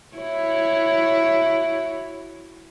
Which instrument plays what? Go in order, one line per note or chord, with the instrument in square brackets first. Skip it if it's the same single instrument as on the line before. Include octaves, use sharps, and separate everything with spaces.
[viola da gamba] E4 F#4 C#5